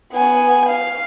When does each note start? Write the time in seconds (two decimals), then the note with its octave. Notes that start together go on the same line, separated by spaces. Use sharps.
0.13 B3 G#5
0.69 F5